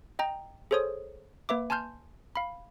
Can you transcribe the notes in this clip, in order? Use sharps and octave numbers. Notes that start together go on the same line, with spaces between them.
D#5 G5 A#5
G#4 A4 C5 C#5 D#6
A#3 B4 E5 D6
G#5 A5 C6 F6 G6
F5 B5